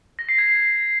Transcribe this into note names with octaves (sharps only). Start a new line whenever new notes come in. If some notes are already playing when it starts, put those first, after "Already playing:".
A#6
C7
G#6